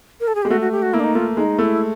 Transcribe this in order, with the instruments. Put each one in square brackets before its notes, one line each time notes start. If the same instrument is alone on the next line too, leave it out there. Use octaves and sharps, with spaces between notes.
[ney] A#4
A4
G#4
[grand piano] G#3 [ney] G4
[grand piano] A3 [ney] F#4
[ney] F#4
G4
F#4
[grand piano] A#3 [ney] E4
[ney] D4
D#4
[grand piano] A3 [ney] F4
[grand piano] G#3 [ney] D#4
[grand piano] A3 [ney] E4